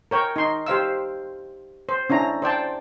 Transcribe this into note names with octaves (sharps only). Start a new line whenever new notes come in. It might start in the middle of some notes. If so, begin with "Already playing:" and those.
A#4 C#5 G5
D#4 C6
G4 C5 F5 E6
C5
C#4 D4 E4 A#5
C5 D5 G5 A5